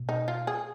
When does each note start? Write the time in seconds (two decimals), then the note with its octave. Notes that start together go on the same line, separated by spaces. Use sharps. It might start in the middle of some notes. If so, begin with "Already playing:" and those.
Already playing: B2
0.09 D#4
0.28 F4
0.47 G#4